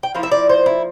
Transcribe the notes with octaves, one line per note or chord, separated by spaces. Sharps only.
G5
F3 A#3 E4 F5
E5
D5
C5
E4